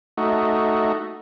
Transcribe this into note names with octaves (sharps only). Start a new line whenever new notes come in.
A3 D#4 F#4